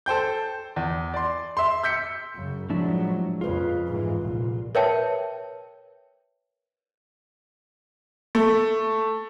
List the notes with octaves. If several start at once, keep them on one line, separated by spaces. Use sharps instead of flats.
A4 C5 G5 G6
E2
D5 C6
E5 C6
E6 G6 B6 C#7
F#2 C#3 F#3
A2 F3 F#3 G#3 D4 E4
F2 C#3 F4 G#4 B4
G#2 E3
C2 A#2
A#4 B4 C#5 E5 G5 A5
A3